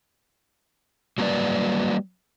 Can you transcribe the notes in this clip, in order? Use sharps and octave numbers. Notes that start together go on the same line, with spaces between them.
F#3 G3 A#3 F#4 B4 D5